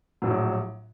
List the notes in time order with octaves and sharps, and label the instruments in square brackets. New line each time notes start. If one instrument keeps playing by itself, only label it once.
[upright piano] A#1 A2 F#3